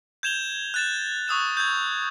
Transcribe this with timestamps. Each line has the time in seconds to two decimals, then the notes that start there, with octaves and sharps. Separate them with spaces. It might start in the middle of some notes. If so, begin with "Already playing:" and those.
0.23 G6 G#6 E7 F7 G7
0.74 F#6 A6 E7
1.28 C#6 D#6 E6 E7
1.57 G6 G#6